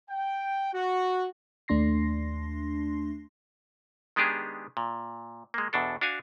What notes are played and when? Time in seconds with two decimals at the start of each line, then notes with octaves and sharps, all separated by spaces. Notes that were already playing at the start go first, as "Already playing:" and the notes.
0.11 G5
0.74 F#4
1.68 D#2 A3 D4 C6 A#6 C7
4.16 D#3 G#3 B3 D4 G4 G#4
4.77 A#2
5.54 G#3 A#3
5.73 E2 B2 D4 A4
6.01 D4 F#4 F5 G#5